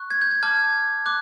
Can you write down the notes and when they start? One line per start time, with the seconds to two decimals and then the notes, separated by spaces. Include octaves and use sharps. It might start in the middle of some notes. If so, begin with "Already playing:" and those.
Already playing: C#6 F#6
0.10 G#6
0.22 G6
0.31 G#6
0.43 A5 D6 F6 G#6
1.06 D6 F#6